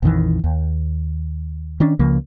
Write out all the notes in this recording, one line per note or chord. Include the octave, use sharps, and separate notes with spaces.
A#1 F2 D#3 E3
D#2
D#3 C#4 D4
C#2 C#3 F3 A#3